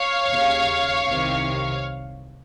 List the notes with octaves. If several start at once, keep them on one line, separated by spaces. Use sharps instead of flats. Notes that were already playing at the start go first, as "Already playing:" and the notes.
Already playing: C#5 F5
D#2 C#3
C2 C3 D#3